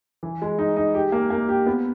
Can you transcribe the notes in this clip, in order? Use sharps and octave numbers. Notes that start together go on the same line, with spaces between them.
E3
G#3
D#4
D#4
G4
A#3
A#3
G4
B3